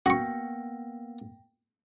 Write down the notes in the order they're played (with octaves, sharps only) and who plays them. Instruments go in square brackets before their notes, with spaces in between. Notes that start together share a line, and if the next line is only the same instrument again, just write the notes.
[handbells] A#3 B3 [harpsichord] F#4 C#6 [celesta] G5 A#6